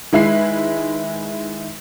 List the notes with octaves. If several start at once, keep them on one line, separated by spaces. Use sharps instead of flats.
D#3 G#3 E4 B4 C7